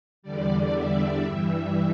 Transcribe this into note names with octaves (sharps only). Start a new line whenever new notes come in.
E2 D3 G3 D5
E5
G2 E3 G3